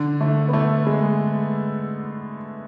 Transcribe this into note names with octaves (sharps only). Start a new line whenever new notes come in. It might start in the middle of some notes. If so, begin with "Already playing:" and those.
Already playing: D3
A3
B3
A3
G#3